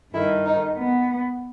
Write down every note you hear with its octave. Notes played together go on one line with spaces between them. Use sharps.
G2 D#3 E4
D#4
B3